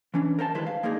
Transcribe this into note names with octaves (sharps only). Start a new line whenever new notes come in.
E3 C#4 D4
A#4 C5 F5 A5
D#3 G3 G#3 E4 B4 C5
F5
G#3 A#3 D4 D#4 G#4